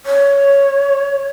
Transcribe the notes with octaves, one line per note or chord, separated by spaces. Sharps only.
C#5